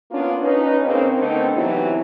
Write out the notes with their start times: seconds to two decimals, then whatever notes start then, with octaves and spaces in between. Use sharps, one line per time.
0.11 A#3 B3 C#4 D4 F4
0.42 C#4 D#4 B4
0.84 C#3 A#3 C4
1.18 D3 A3 B3 C4 D4 D#4
1.54 C3 E3 F#3 B3 E4